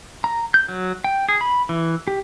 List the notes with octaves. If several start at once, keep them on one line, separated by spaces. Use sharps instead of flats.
A#5
G6
F#3
G5
G#4
B5
E3
G4